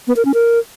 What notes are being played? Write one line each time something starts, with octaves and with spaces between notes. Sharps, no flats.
B3
A#4
C#4
A#4